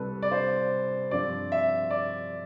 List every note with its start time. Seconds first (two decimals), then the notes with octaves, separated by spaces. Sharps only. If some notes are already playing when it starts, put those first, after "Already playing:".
Already playing: C2 C3 G3 C4 A4 B4
0.22 D5
0.31 C5
1.11 G2 F3 C4 D5
1.52 E5
1.90 D5